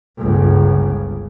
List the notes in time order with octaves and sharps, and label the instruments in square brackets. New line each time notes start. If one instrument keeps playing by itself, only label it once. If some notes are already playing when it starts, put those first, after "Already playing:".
[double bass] G1 C#2